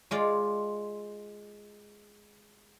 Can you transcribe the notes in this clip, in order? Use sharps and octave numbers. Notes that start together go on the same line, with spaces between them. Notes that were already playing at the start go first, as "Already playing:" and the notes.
G#3 F4 D5